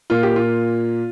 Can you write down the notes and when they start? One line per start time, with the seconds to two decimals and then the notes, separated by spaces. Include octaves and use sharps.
0.10 A#2 A#3 F4
0.23 G4
0.36 F4